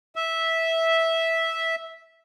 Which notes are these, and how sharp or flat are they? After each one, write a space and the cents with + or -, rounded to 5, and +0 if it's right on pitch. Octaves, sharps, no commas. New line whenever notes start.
E5 -10